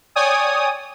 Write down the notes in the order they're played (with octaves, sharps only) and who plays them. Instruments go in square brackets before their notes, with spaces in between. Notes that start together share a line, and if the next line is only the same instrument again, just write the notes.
[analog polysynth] C#5 D5 G5 G#5 D#6